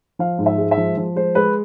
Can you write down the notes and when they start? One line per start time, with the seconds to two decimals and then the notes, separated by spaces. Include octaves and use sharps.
0.19 F3 F5
0.39 G#2
0.46 E5
0.58 G#3
0.71 E5
0.77 F3
0.97 F3
1.16 G#3 C5
1.35 G#3 B4